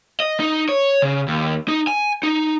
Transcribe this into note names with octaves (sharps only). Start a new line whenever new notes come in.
D#5
D#4
C#5
C#3
D#2
D#4
G#5
D#4